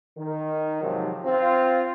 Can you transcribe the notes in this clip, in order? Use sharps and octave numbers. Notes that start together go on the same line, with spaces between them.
D#3
G#2 C3 F3 F#3
C4 F4